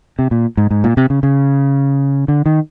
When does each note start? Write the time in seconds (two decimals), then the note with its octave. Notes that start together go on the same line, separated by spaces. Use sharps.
0.19 C3
0.31 A#2
0.57 G#2
0.71 G#2
0.84 A#2
0.97 C3
1.10 C#3
1.23 C#3
2.28 D3
2.46 D#3